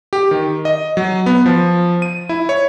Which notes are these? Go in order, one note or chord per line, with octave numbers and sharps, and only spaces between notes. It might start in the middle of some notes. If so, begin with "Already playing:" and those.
G4
D#3
D#5
F#3
B3
F3
D#7
E4
C#5